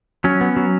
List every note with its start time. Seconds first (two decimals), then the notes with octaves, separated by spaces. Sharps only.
0.24 F#3 C#4
0.41 B3
0.56 F#3